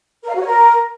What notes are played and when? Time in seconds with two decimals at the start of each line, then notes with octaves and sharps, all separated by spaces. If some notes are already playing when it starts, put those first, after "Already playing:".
0.23 A#4
0.29 F5
0.35 F#4
0.41 C#5
0.47 A#4